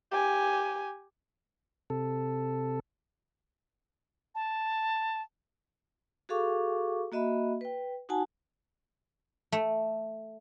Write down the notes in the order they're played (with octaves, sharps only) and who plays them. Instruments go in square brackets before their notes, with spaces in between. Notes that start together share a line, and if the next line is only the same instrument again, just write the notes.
[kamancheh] G4 G#5
[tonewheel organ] C3 A4
[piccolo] A5
[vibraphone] F#4 G#4 A4 F5 C#6 D6
A#3 F#4 D#5 E5 B5
B4 G5
D#4 F#4 F#5 G#5 A5
[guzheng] A3